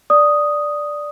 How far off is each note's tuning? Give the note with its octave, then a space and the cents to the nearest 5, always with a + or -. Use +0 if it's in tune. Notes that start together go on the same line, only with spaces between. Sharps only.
D5 +0 D#6 +0